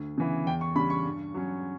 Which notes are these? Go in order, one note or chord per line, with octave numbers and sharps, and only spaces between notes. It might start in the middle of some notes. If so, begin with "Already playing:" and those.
Already playing: D2
C#3 E3 B3
E2 G5
C#6
C#3 G3 B5
C#6
G2
F#3 C#4